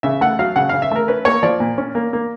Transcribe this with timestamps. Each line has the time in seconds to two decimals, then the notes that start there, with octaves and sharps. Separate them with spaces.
0.03 C#3 E5
0.21 A3 F#5
0.39 F#3 F5
0.56 C#3 F#5
0.69 C#3 F5
0.82 E5
0.91 A3 A#4
1.08 C#4 B4
1.25 A#3 C#5
1.43 F3 D5
1.60 A#2
1.78 C#4
1.95 A#3
2.13 A#3